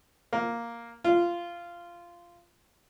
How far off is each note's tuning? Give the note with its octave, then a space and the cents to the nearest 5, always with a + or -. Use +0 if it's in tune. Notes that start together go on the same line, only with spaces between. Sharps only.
A#3 +0
F4 -15